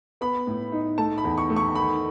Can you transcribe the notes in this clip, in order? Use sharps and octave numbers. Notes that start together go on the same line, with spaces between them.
B3 B5
A2
D#4
A3 A5
B5
E2
C#6
A3
C#6
D#3 B5